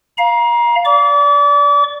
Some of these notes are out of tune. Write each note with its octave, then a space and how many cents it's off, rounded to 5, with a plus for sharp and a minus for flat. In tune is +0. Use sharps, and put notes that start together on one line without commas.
F5 +0 A#5 +30
D5 -20 D6 -35